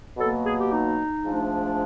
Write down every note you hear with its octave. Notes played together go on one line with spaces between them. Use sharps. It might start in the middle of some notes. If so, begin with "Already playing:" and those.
B2 F#3 A#3 A4
G#4
G4
D#4
G#2 F3 A3 D4